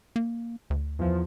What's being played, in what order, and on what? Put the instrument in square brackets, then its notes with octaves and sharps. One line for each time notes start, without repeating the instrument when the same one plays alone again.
[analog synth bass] A#3
D2
[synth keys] E2 F3